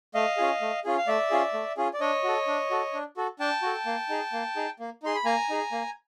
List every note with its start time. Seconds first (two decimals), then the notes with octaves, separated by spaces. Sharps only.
0.14 A3 D#5 F5
0.37 C#4 F4 G#4
0.61 A3
0.84 C#4 F4 G#4
0.97 F5
1.07 A3 D5 E5
1.30 C#4 F4 G#4
1.54 A3
1.77 C#4 F4 G#4
1.93 D5
2.00 D4 C#5 D#5
2.24 F#4 A4
2.47 D4
2.71 F#4 A4
2.94 D4
3.17 F#4 A4
3.39 D4 G5 A5
3.62 F#4 A4
3.86 A#3
4.09 D#4 G#4
4.33 A#3
4.56 D#4 G#4
4.80 A#3
5.03 D#4 G#4 C6
5.15 B5
5.25 A#3 G#5 A#5
5.50 D#4 G#4
5.72 A#3